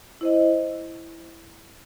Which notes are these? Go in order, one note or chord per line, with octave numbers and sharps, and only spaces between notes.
E4 C5 D#5